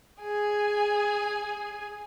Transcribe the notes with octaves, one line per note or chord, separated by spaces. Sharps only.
G#4 G#5